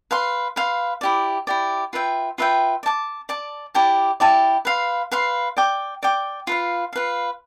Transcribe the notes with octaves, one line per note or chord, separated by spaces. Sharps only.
B4 F5 C6
B4 F5 C6
E4 G4 D5
E4 G4 D5
F4 B4 E5 G5
F4 B4 E5 G5
D5
A5 D6
D5 A5 D6
E4 G4 D5 A5
E4 G4 D5 A5
B4 F5 C6
B4 F5 C6
D5 G5 D6
D5 G5 D6
F4 B4 F5
F4 B4 F5